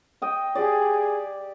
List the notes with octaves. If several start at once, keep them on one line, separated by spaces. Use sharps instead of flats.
D#5 G5
G4 G#4 D5